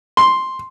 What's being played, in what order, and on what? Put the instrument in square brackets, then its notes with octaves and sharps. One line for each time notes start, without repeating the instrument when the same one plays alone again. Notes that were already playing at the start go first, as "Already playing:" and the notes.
[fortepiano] C6